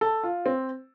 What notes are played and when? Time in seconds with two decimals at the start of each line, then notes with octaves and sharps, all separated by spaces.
0.01 A4
0.23 F4
0.46 C4